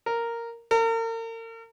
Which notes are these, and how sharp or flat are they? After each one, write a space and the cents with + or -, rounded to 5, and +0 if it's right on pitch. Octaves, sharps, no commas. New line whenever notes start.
A#4 -5
A#4 -40